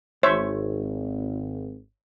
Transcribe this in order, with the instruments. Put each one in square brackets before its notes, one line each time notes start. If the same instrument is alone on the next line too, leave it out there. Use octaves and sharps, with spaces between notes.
[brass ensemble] G#1 [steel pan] C5 C#5 E5